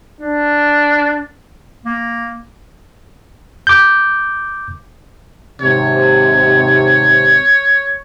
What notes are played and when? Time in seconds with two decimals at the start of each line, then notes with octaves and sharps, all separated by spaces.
0.21 D4
1.85 A#3
3.67 D6 G6
5.61 D#2 G#2 C3 C#5